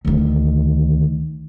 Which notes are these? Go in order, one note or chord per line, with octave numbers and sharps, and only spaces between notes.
D2 D#3